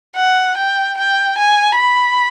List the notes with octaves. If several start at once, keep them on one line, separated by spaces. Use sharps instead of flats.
F#5
G5
G5
G#5
B5